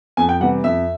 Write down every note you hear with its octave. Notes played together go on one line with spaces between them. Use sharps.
F2 G#5
G5
C3 E3 G3 F#5
F2 E5